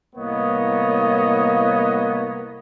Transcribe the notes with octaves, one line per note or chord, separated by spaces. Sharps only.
C2 A2 A#3 B3 C#5 D#5